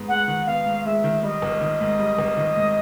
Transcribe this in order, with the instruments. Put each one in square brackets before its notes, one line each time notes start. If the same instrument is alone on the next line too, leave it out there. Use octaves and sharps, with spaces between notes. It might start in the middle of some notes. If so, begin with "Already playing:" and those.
Already playing: [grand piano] G#2 B3
[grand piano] G#3 [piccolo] F#5
[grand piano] D#3
[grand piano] B3 [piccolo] F5
[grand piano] G#2
[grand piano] G#3 [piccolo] E5
[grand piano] D#3
[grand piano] G3 [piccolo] D#5
[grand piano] G#1
D#3
G#2
G3
G#1
D#3
G#2